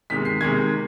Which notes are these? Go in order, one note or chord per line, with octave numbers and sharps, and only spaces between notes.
C3 D#3 G#3 B6
C7
C3 D#3 G#3 G#6